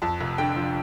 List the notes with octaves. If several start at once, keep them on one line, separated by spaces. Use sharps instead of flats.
F2 A5
F1
D3 G5
F3